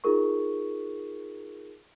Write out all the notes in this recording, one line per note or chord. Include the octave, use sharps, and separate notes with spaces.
D#4 F4 G#4 A#4 C#6